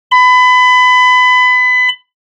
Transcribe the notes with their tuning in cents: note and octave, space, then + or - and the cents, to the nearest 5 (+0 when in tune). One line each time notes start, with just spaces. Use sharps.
B5 +25